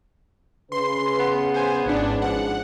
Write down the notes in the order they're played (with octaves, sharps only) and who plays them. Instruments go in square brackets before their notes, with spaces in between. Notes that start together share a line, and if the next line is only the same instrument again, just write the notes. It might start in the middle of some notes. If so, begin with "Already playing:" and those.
[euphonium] C#3 [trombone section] B4 [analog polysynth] C6
[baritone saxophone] B3
[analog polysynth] C5 G#5
[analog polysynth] G#1 D4 [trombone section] G#2 [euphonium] C#4
[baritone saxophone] F3 [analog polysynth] F#5